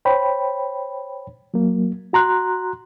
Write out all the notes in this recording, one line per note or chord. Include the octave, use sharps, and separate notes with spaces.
C5 C#5 G5 B5
F#3 A#3
F#4 A#5 C6 F#6